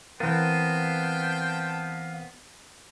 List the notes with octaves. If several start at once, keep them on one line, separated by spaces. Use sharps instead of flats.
E3 B3 C4 A#4 F5 G5 A5 C6